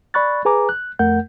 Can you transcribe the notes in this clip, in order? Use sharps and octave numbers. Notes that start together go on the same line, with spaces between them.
D5 B5 C#6 F#6 A6
G#4 B4 G#5 A#5 D6
F#6
F2 A3 A#4 F#5 G6